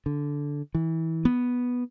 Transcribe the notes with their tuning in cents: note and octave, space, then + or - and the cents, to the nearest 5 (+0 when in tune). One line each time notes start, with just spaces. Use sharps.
D3 -10
E3 -25
B3 -5